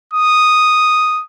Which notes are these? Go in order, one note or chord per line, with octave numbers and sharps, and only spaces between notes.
D#6